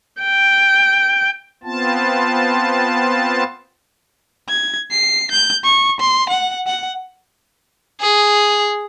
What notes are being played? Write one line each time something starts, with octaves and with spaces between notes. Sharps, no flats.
G5
B3 C4 F4 A5
G#6
C7
G6
C#6
C6
F#5
F#5
G#4